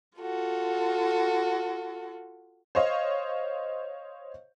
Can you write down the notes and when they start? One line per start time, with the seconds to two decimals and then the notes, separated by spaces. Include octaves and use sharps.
0.18 F4 F#4 A4
2.75 C5 C#5 D#5 F5